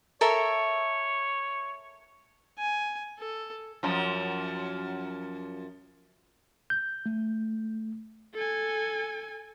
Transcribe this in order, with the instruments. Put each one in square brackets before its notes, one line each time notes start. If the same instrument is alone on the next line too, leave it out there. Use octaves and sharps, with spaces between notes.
[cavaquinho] A4 A#4 E5 [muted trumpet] C#5
[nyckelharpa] G#5
A4
[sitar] F#2 F3
[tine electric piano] G6
A3
[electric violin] A4 G#5